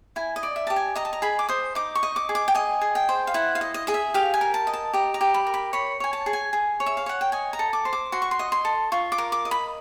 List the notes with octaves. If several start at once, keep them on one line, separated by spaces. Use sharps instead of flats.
E4 G#5
D#5
D5
E5
G4 A5
G#5
D#5 A#5
A5
A#5
G#4 B5
D6
C5 D#6
D#4 D6
C#6
D#5
D6
G#4
D6
G5
D#5 G#5
G#4
G5
C5
F5
E4 F#5
F5
D#5
D#5
G#4 D#5
E5
G4 F5
G#5
A#4
A5
D#5
A5
G4 A#5
A#5
G4
B5
A#4
B5
C#5 B5
C#5 G#5
A5
G#4
G#5
G#4
C#5
E5
F5
C#5 F#5
G5
D#5 G#5
A#5
A4
D6
C5
D6
F#4 C6
C#6
C6
D#5
C6
A4
F4 C#6
D6
A#4
D6
D#5
B5